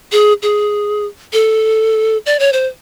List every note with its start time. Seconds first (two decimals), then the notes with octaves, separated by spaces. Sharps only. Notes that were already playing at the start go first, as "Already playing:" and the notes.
0.12 G#4
0.42 G#4
1.33 A4
2.26 D5
2.39 C#5
2.53 C5